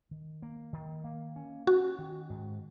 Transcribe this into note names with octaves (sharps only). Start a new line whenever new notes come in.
D#3
A#3
D#3
A#3
C#4
C#4 F#4
D#3
G#2